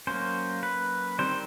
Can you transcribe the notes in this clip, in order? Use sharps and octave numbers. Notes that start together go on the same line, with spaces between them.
F#3 A#3 C#4 C5
B4
D#3 G3 C4 C5